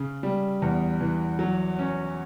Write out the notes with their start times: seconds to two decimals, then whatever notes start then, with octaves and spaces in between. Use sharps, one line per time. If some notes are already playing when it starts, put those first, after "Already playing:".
Already playing: C#3
0.23 G3
0.62 E2
1.01 E3
1.39 F#3
1.79 C#4